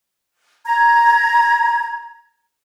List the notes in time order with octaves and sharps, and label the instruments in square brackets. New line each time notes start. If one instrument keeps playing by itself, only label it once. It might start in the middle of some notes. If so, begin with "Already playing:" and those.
[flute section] A#5 G#6